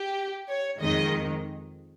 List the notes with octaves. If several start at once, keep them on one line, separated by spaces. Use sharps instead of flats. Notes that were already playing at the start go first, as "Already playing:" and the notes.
Already playing: G4
C#5
F2 D#3 G#3 D#5